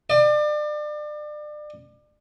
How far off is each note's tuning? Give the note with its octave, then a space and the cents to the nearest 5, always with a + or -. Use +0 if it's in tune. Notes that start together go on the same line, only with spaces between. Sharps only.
D5 +35